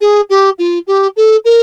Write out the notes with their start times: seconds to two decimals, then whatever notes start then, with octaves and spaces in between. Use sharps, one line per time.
0.01 G#4
0.30 G4
0.59 F4
0.87 G4
1.16 A4
1.45 A#4